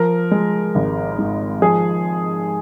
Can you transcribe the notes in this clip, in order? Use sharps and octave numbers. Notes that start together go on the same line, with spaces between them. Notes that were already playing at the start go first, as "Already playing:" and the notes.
Already playing: F3 A#4
G#3
G#1
G#2
F3 G#4